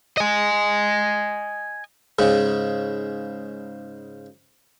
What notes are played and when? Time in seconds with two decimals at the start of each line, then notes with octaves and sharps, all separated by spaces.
0.17 D#5 G#5
2.19 G#2 C#3